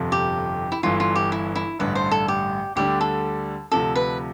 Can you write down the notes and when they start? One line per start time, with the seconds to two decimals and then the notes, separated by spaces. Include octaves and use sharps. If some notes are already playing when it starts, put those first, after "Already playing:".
Already playing: G1 F2 C3 F3
0.12 G4
0.72 E4
0.83 G1 G2 E3 F4
1.00 F4
1.15 G4
1.32 E4
1.55 E4
1.79 A1 G2 D3 A3 B4
1.95 C5
2.11 A4
2.28 G4
2.76 D2 D3 G3 D4 G4
3.01 A4
3.72 D2 C3 F3 A4
3.96 B4